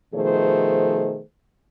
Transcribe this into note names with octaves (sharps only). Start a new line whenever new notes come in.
B2 D#3 F3 A3 G#4 C5